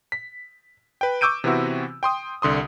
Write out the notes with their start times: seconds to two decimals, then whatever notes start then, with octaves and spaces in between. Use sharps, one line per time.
0.12 B6
1.01 B4 G5
1.21 C#6 D6 E6 G6 D7 D#7
1.44 C3 E3 B3 C4 E4 F#4
2.03 G5 C6 D#6
2.42 C2 D3 C6 D#6